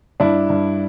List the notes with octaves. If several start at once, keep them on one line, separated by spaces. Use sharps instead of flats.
G2 D4 E4
G2